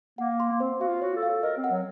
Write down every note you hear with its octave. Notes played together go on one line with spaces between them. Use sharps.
A#3 F#5
C6
A#3
C4 C5
F#4 F5
F4
F#4 C#5
A4
F5
A4
A#4 D#5
C4
F#5
F#3